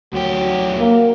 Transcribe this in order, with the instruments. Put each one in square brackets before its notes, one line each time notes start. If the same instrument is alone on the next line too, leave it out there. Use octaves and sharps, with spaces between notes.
[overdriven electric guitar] D2 G4 [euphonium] F#3
[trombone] A#3